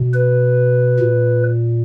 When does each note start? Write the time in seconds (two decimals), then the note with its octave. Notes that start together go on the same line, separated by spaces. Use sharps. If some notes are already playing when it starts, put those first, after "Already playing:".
Already playing: B2
0.13 B4
0.99 A#2